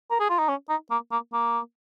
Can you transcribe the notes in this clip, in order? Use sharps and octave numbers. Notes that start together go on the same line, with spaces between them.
A#4
G#4
F4
D#4
C#4
D#4
A#3
A#3
A#3